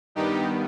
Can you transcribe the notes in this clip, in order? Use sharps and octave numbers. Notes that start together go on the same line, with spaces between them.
G2 D#3 G3 B3 D#4 G4